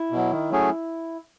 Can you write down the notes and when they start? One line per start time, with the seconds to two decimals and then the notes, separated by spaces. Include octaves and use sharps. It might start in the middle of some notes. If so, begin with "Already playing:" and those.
Already playing: E4
0.11 B2 F#3
0.31 D#3
0.50 F#3 A3 C#4 G#4